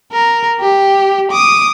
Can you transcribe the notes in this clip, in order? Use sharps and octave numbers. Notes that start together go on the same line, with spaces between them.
A#4
G4
D6 D#6